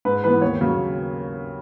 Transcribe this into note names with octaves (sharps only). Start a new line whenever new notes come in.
G#2 B4
E3 B3 B4
D#2 C#5
C#3 F#3